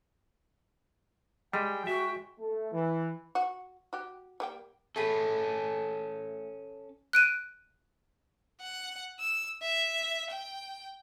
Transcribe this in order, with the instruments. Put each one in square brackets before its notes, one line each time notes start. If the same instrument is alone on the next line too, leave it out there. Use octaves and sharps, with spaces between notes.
[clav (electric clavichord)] G3 [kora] G#3 [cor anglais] G5
[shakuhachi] F#4 [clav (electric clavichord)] E5
[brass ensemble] A3
E3
[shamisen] F#4
F#4 G4
G3 A#3 G5
[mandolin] A3 G#4 B5 [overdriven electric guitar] C#4 A4
[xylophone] F#6 D7 D#7
[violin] F#5
E6
E5
G5